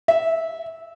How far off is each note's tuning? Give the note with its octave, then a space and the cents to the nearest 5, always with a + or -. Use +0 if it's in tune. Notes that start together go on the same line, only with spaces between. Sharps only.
E5 -15